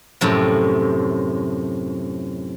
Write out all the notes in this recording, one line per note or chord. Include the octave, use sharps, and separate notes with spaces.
F#2 A2 C3 F3